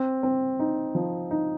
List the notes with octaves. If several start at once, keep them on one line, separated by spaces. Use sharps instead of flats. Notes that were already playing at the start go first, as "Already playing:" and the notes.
Already playing: C4
C4
D#4
F3
D#4